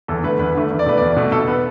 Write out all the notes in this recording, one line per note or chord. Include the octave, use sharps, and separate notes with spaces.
E2 A4
D3 A3 B4
E2 B4
D3 A3
E2
D5
B2 A3 B4
E2 D5
B2 A3
B2 A4
B3 B4